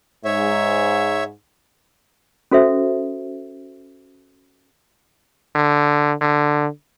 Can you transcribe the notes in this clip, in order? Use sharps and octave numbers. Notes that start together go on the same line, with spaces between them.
G#2 C#5 E5
C#4 F#4 A4 C5 E5
D3
D3